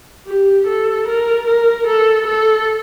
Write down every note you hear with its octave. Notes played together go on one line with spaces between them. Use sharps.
G4
A4
A#4
A#4
A4
A4